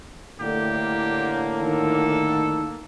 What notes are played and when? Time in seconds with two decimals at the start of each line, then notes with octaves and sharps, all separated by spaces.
0.40 A2 D3 A#3 G4
1.63 D#3 A4